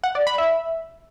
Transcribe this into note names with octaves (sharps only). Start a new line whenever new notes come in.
F#5
D5
B5
E5